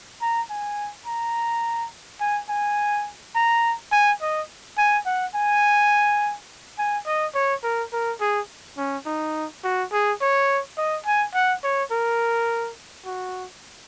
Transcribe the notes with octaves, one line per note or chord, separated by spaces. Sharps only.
A#5
G#5
A#5
G#5
G#5
A#5
G#5
D#5
G#5
F#5
G#5
G#5
D#5
C#5
A#4
A#4
G#4
C#4
D#4
F#4
G#4
C#5
D#5
G#5
F#5
C#5
A#4
F#4